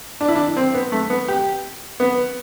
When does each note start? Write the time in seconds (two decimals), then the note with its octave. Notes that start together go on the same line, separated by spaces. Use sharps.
0.21 D4
0.28 E4
0.35 D4
0.57 C4
0.74 B3
0.92 A3
1.10 B3
1.28 G4
2.00 B3